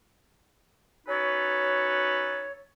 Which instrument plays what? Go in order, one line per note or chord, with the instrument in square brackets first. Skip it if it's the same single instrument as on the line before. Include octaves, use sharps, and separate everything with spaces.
[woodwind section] C#4 D#4 F#4 A4 B4 C#5